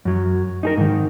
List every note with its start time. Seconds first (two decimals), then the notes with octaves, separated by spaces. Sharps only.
0.05 F#2 F#3
0.63 D#4 G#4 A#4
0.77 G#2 D#3